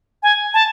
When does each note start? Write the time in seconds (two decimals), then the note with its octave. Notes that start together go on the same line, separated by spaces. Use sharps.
0.23 G#5
0.54 A5